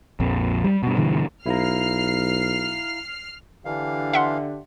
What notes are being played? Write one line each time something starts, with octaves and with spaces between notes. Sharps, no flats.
A#1 F2
G3
G2 B2
G2 B2 D3 E3
B1 E4 F5 A#5 F6 C7
D3 E3 D4 G4 F5
E5 F#5 C6